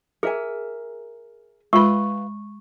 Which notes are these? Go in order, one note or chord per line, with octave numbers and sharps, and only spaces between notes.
G#4 A#4 E5 G#5
G#3 F4 B4 B5 C#6